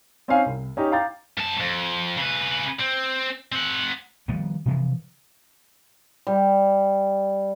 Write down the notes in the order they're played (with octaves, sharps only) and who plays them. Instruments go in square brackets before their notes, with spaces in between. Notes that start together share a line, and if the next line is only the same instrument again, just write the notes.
[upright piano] C4 C#4 D#4 E5 F5 G#5
C2
C#4 D#4 G4
F5 G5 A#5 D6 G6 A6
[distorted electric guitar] F#2 A5
F2
C#3 B4
C4
C4 F#5
[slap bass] D#3 F3 G3 B3
C3 E3 F3
[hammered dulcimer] G3